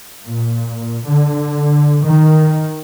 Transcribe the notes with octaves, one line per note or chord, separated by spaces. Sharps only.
A#2
D3
D#3